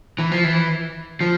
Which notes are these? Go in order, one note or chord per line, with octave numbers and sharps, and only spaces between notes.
E3
F3
E3
F3